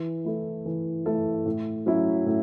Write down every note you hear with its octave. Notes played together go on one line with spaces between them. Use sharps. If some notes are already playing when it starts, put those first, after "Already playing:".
Already playing: E3
A3 E4 A4
E3
A3 E4 A4
A2
F#3 C#4 E4
A2